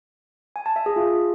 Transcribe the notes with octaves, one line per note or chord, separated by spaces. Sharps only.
G#5
A5
E5
G#4
F4